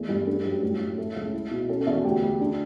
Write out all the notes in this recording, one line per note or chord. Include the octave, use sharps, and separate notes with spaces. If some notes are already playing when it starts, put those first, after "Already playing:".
Already playing: E2 A3
G2
D4 A4
F#2 G4
A2 G4
A2
A3
C#2
E4
B2
C#4 A4
A4
E2
F#4
D2 G4
D2
D4